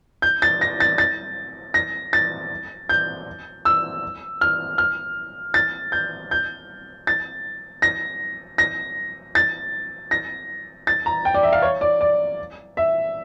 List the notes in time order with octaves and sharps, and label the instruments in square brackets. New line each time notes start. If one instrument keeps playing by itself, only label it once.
[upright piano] G6
A6
A#6
A6
A6
A#6
A6
G6
E6
F6
F6
A6
G6
G6
A6
A#6
A#6
A6
A#6
A6
A#5
G5
D5
E5
F5
C#5
D5
D5
E5